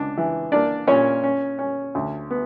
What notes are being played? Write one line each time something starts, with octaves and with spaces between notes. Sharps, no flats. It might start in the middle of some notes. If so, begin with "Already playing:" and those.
Already playing: C#2 D4
E3
A#3 D4 D5
A#2 C#4 C#5
C#4
C#4
D2
B3